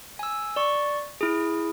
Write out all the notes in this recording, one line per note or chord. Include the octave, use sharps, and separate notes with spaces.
G#5 E6
D5 C#6
E4 G#4